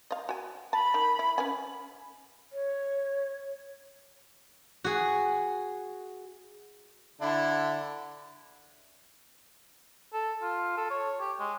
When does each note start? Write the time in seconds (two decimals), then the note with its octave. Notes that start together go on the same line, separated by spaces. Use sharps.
0.11 D#5 F5
0.29 F#4 G#5
0.73 A5 B5
0.94 D#3
1.19 E4
1.38 C#4 B4 G#5
2.53 C#5
4.84 F#4 G#4
7.21 D3 D4 E4
10.13 A4
10.43 F4
10.77 A4
10.91 C#5
11.20 G4
11.40 G#3